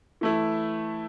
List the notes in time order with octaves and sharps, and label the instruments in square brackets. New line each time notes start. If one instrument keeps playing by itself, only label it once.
[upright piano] E3 A3 E4